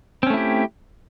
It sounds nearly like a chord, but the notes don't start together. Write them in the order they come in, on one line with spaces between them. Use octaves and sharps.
C4 C#4 A3 E4 G4